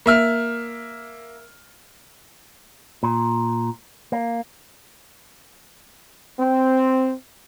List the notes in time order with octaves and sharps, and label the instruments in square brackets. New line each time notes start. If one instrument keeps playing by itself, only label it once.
[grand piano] A#3 E5 F6
[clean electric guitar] A#2
A#3
[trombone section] C4